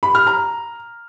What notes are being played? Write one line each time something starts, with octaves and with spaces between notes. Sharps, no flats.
B5
F6
A#5